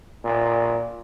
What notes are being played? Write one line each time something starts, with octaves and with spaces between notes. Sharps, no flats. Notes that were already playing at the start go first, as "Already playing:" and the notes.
A#2